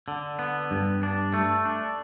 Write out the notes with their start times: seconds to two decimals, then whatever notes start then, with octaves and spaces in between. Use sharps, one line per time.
0.08 D3
0.39 B3
0.71 G2
1.03 D4
1.34 A3
1.65 D4